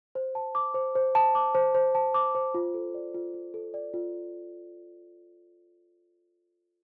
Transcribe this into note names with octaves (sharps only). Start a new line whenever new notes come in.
C5
A5
D6
C5
C5
A5
D6
C5
C5
A5
D6
C5
F4
A4
D5
F4
F4
A4
D5
F4